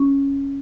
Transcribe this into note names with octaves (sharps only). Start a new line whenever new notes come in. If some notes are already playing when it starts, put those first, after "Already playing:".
Already playing: C#4